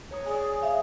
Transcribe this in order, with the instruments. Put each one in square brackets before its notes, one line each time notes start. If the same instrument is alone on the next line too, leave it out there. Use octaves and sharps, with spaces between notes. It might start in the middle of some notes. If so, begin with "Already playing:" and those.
[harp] C#5 A#5 D#6
[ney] G#4 [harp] D5 G#5
[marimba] E5 F5